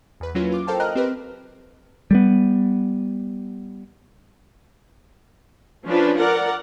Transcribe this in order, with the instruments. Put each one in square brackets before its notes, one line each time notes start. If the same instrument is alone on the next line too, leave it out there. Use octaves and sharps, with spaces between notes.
[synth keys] E2 B4
F#3 A#3 C#4 E4 F4 B4
F4 D6
A4 A#4 C5 F5 G5 A5
A#4 D#5 G5 A#5 F6 F#6
C4 G4 A#4 B4
[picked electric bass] G3 G#3 B3
[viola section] F3 C#4 D4 B4
A#4 D5 F#5